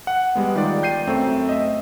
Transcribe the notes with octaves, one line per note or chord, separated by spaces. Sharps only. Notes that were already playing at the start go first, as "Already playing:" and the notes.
F#5
G3 G#3 B3
D#3 F4 D5
G5 G6 C7 D#7
F#2 A3 C4
D#5 E5